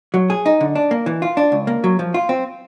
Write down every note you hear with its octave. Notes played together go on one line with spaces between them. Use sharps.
F#3
G#4
D#4
D3
D4
A#3
E3
F4
D4
C#2
A#3
F#3
F3
F4
C4